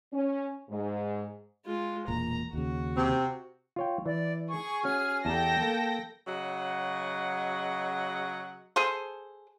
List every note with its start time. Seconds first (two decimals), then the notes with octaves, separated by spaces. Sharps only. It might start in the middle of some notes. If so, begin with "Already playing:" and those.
0.13 C#4
0.69 G#2
1.65 G#3 F4
2.08 E1 A#2 A#5
2.53 D#2 C#3 F#4
2.97 C3 C4
3.76 F4 C#5 G5
4.06 E3 D5
4.49 G#4 C#6
4.84 C#4 F#4 F6
5.25 E2 G4 A4 G5 A5 A#5 A#6
5.62 A#3
6.28 C#3 F#3 F#4 D#5 F#5
8.76 G#4 A4 C5